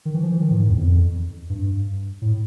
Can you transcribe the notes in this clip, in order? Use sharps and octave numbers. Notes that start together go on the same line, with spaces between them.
D#3
E3
F3
E3
D#3
A2
G#2
E2
F2
G2
A2